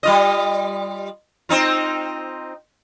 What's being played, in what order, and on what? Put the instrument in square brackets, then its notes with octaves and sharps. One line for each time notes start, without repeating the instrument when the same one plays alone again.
[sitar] G3 F4 D#5
C4 D#4 F4